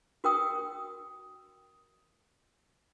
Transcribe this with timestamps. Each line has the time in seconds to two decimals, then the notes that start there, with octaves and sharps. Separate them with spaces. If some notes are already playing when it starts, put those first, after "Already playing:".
0.24 F#4 A#4 G5 D#6